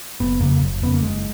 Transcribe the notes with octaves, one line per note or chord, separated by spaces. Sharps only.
F#1 B3
F2 C#3 A#3
F#1
F2 C#3 B3
A#3
F#1 G#3